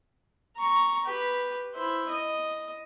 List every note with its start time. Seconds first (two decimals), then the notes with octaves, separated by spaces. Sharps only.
0.57 A#5 C#6
1.06 G4 B4
1.73 E4 C5
2.09 D#5